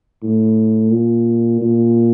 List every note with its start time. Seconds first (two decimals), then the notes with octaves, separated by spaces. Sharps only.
0.23 A2
0.91 A#2
1.62 A#2